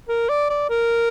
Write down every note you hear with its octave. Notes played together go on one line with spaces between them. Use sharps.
A#4
D5
D5
A#4